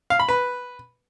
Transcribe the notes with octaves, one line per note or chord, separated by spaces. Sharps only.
F5
B5
B4